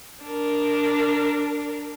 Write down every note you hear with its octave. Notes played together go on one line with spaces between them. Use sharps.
D4 A#4